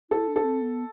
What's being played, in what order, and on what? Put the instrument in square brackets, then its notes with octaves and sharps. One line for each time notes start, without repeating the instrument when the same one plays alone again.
[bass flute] E4 [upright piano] A4
[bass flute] D4
[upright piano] A4
[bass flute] C4
B3